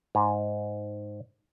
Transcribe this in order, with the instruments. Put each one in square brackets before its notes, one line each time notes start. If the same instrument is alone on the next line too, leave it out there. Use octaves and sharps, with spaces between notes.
[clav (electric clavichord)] G#2